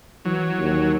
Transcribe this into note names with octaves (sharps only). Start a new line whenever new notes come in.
E3 F#3
D#2